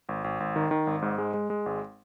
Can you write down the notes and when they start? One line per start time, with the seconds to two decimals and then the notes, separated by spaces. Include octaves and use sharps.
0.09 G#1
0.24 G#1
0.40 G#1
0.56 D#3
0.71 D#3
0.87 G#1
1.02 G#2
1.18 G#3
1.34 G#3
1.50 G#3
1.66 G#1